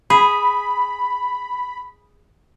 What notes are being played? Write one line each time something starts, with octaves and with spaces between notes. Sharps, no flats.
G#4 B5